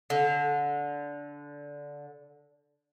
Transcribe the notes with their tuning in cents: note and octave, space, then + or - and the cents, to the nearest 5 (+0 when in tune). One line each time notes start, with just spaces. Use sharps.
D3 -15